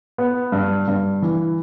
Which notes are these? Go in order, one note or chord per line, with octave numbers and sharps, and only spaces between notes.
B3
G2
G2
E3